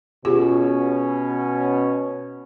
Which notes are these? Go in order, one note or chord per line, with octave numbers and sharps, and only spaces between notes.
B2 C#4 F4 G4 G#4